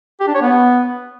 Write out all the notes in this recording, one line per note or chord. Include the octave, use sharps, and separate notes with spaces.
G4
D4
C#5
B3